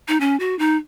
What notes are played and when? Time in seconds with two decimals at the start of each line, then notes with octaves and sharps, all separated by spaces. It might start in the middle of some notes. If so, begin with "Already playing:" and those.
0.08 D#4
0.20 C#4
0.40 F#4
0.59 D#4